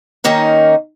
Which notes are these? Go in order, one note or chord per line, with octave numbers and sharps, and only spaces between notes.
D#3 A#3 C#4 D#4